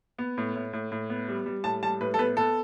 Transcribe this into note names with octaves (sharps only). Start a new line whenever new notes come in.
B3
A2
A2
A2
A2
B3
G3
G3
A2 A5
G3 A5
A2 B4
A4
B3 B4
B3 A4